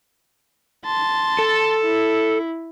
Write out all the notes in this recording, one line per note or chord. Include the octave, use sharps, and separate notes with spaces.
A5 C6
A4
E4